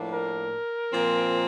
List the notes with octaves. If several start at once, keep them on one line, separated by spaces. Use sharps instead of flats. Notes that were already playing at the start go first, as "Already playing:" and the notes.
Already playing: A2 F3 A#3 D4
A#4
A#2 F3 C4